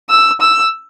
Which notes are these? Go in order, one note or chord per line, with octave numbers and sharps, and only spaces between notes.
E6
E6